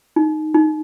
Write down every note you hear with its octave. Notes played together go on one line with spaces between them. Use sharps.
D#4
D#4